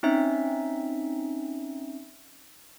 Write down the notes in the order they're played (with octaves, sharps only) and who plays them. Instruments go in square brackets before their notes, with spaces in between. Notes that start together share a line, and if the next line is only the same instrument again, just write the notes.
[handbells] C4 C#4 D#4 E5